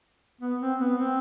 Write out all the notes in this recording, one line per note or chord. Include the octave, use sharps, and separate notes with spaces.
B3
C4
B3
C4